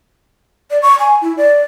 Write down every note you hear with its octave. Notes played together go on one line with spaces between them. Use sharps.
D5
C#6
G#5
E4
D5